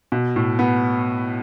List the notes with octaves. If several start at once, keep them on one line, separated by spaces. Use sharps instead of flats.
B2
A2
B3